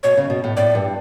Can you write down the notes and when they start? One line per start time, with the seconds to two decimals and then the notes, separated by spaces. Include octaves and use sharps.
0.03 B2 C#5
0.17 C#3
0.30 B2
0.44 A2
0.57 A2 D5
0.75 G2